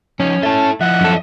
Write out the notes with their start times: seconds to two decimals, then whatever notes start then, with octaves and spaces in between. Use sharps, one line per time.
0.20 F3 C#4 D#4
0.43 E4 A4 E5 A5
0.81 F3 E4 D#5 E5 F#5
1.01 F#2 A4